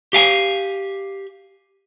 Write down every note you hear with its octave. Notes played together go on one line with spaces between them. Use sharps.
G4 F5 G#5